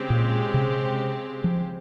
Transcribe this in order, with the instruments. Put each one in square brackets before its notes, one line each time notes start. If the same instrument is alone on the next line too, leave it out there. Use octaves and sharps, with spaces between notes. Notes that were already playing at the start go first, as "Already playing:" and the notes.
Already playing: [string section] C#3 G#3 C4 G4
[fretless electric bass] A#2
C3
F3